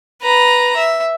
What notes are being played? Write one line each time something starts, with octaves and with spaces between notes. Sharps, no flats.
B4 A#5
E5